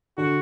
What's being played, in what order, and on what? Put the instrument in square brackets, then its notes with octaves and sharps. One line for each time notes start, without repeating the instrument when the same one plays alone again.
[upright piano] D3 [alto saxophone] F#4